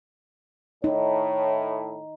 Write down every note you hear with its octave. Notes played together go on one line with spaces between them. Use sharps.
A2 D#4 C#5